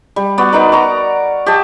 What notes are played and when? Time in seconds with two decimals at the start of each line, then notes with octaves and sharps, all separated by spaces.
0.16 G3
0.38 B3 F#4 D5
0.52 B3 D#4 A#4 D5
0.72 F#4 D5 A#5
1.46 G4 D5 D#5 A5